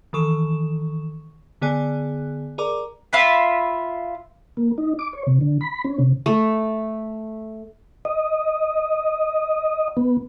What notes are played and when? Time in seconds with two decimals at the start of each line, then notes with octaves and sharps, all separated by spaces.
0.13 D#3 E3 A4 C#6 E7
1.61 D3 B3 G#4 D5 G#5 F#6
2.58 G#4 A#4 D5 A#5 D6
3.13 F4 E5 B5
4.57 A#3
4.78 D#4
4.99 D6
5.13 C#5
5.27 C3
5.41 D3
5.61 B5
5.84 C#4
5.99 C3
6.26 A3
8.05 D#5
9.97 B3